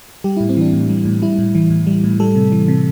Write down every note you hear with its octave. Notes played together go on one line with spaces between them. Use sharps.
G3 G4
A2 E4
C4
E3 D4
A2
G3
A2
G3 E4
A2
E3
A2
G3
A2
G3 A4
C3
E3
C3